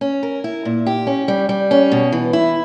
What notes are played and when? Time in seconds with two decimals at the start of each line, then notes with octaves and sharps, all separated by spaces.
0.01 C#4
0.23 A#4
0.44 E4
0.65 A#2
0.86 G4
1.07 C#4
1.28 G3
1.49 G3
1.71 C#4
1.92 B2
2.12 E3
2.33 E4